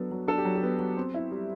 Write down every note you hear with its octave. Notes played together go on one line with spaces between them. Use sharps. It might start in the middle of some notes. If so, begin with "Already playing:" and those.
Already playing: F#3 B3 D4 A4
F#3
D4 A4
G4
F#3
G4
B3
F#3
C4
E4
G3